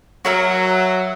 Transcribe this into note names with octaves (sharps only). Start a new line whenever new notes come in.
F#3 F#4 A#4 E5